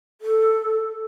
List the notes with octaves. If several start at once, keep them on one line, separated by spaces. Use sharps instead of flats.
A4